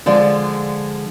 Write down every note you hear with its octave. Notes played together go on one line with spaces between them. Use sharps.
D3 F3 G#3 D5